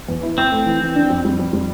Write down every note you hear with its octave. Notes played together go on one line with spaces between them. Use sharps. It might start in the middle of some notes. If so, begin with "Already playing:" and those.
E2
E4
C4 E4
A3
E3
E3
D4
F2
G3
F2
G3